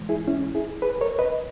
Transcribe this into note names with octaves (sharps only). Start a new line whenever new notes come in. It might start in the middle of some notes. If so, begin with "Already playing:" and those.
Already playing: G#2 E3 G#3
E4 G#4
C#4 E4
E4 G#4
G#4 B4
A#4 C#5
B4 D#5